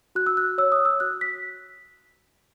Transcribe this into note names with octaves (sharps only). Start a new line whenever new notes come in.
F#4 F#6
E6
F#6
C#5 E6
D#6
E6
F#4 F#6
B6